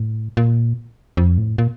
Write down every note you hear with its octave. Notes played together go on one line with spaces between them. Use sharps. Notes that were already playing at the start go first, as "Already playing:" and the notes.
Already playing: A2
A#2
F2
A2
A#2